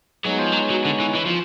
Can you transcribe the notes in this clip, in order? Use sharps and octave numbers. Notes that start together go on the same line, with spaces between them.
F#3 G#3 B3 D#4 G#4 C#5
F3
F#3
F#3
D3
E3
E3
F3